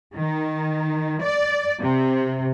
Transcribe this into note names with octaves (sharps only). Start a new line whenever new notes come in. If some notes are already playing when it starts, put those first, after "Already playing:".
D#3
D5
C3